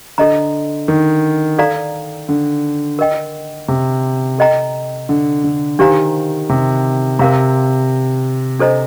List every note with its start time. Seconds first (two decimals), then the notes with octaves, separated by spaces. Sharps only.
0.18 D3 A4 D#5 A#5
0.88 D#3
1.59 A4 D5 F5 A#5
2.29 D3
2.99 A#4 D#5 G5
3.68 C3
4.39 A4 D#5 G5 A#5
5.09 D3
5.44 D3
5.79 D#3 D4 G4 C5 F5 A#5
6.49 C3
7.19 C3 A#4 F5 A#5
8.59 D4 A4 C5 D#5 A#5